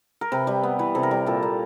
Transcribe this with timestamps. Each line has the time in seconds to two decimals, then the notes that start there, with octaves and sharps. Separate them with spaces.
0.21 A#4
0.32 C3 B4
0.47 G3
0.63 B3
0.79 E3 B4
0.95 C3 A4
1.03 A#4
1.11 G3
1.26 A#2 A4
1.42 A#3